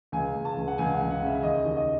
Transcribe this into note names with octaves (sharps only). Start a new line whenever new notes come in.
C#2 G#5
C#2
A5
C#2
F#5
C#2 G#5
F#5
C#2
F#5
C#3 E5
D#2 D#5
D#2
D#5